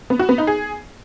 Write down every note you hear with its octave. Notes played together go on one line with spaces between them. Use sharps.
B3
F#4
B3
D#4
G#4